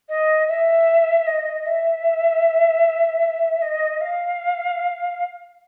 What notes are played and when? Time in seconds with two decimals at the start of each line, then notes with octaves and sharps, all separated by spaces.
0.09 D#5
0.48 E5
1.27 D#5
1.66 E5
3.62 D#5
4.01 F5